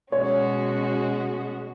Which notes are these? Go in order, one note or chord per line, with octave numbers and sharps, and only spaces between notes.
B2 G#3 C#4 F#4 C#5